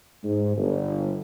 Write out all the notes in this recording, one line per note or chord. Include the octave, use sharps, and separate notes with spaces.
G#2
G1